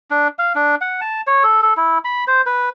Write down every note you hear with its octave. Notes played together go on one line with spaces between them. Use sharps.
D4
F5
D4
F#5
A5
C#5
A4
A4
E4
B5
C5
B4